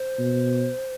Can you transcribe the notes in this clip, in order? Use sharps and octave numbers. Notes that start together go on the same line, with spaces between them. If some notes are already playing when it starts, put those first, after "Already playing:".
Already playing: C5
B2